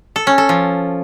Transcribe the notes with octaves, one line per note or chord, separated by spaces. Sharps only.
A4
C#4
A4
F3